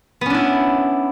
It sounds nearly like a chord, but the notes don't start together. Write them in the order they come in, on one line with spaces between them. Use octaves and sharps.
B3 C#4 D4 E4